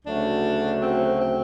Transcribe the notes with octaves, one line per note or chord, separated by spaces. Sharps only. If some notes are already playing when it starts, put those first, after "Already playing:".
D2 C#3 F#3 A3 D4
C4
C4